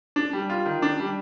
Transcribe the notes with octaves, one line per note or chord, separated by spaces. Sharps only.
D4
G3
F4
D#3
D4
G3